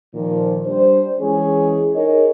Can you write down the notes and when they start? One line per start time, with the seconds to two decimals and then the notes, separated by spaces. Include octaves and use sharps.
0.15 A#2 D#3 F3
0.66 G3 D4 C5
1.20 E3 G#3 C#4 G#4
1.95 D#4 G#4 A#4 C#5 D#5